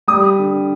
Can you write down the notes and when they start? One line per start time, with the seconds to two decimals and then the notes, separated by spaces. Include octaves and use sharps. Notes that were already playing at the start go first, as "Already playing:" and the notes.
0.08 G3 D#6
0.39 D3